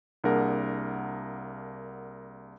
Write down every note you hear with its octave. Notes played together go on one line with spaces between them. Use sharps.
C2 A#3 D4 G#4 A#4 F#5